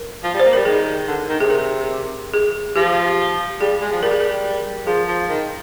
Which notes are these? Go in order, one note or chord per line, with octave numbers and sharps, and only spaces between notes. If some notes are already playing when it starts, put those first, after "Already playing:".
Already playing: A#4
F3
G3
C5
A#3
G3 A#4
D#3 G#4
D3
D#3
C3 G#4
A#4
G#4
F3 G4
G3 G#4
G#3
F3
G3 A#4
G#4
A#4
F3 G#4
F3
D#3